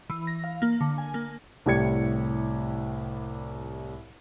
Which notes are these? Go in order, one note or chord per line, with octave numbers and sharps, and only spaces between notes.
E3
A#6
F5
A#3
D3
G#5
A#3
C2 A2 G4 D5 G#6 C#7